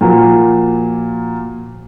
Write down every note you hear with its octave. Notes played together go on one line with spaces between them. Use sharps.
A#2 F3 A#3 F4 F#4